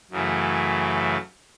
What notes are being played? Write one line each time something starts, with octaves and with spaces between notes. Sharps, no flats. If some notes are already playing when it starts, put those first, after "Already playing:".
F#2 C#3 E3 A3